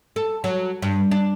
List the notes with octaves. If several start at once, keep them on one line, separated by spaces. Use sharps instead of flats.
A4
F#3
G2
D4